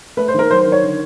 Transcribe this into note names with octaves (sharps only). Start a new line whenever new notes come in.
A3 B4
C5
D#3 A#4
F#3 C5
C5
D#3
C#5
D3